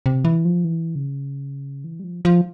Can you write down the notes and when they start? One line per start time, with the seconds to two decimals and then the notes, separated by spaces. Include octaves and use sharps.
0.06 C3
0.25 E3
0.45 F3
0.65 E3
0.95 C#3
1.84 E3
2.00 G3
2.04 F3
2.25 F3